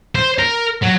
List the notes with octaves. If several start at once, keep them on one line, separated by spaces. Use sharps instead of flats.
C5
A#4
F#3